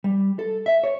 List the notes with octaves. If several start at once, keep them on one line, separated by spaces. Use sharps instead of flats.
G3
A4
E5
C#5